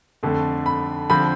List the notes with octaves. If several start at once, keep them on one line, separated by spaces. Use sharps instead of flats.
F2 D3 A3
B5
D3 F3 C4 B5